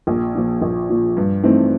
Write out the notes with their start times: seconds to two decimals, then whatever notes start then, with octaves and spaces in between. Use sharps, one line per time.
0.07 A#1
0.35 A#2 F3
0.62 A#1
0.89 A#2 F3
1.17 G2
1.43 E3 A3 C4 D#4